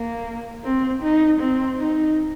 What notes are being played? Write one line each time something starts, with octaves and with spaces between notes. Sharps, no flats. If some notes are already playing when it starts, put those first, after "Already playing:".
Already playing: A#3
C4
D#4
C4
D#4